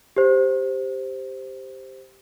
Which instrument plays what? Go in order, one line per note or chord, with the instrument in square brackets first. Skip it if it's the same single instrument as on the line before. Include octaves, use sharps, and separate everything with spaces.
[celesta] G4 C5